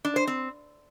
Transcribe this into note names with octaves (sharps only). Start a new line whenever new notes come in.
D4
C5
C4